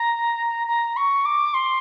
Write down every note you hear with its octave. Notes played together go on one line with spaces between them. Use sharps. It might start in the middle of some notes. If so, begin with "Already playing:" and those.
Already playing: A#5
A#5
C#6
D6
C6